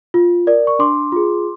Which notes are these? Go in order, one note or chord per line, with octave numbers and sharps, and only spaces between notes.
F4
A#4 D5
C#6
D4 C6 D6
F4 G#4